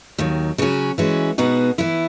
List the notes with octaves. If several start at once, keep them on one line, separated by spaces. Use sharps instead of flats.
D#2 D#3 F#3
C#3 F#3 C#4 F#4
E3 G#3 C#4 F#4
B2 G#3 B3 D#4 F#4
E3 B3 E4